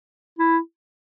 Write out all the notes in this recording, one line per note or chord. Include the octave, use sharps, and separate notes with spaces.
E4